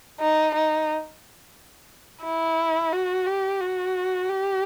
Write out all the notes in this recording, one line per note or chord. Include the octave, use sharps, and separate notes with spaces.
D#4
D#4
E4
F#4
G4
F#4
G4